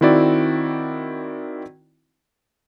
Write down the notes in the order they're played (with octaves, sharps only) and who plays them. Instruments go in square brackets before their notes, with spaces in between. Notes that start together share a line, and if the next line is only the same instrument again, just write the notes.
[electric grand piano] D#3 C4 E4 F#4 D5